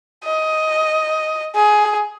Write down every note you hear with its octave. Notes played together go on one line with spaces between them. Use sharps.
D#5
G#4